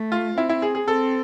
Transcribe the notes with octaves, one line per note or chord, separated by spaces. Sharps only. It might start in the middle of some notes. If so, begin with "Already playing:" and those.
Already playing: A3
F4
C4 E4
E4
G#4
G#4
C4 A4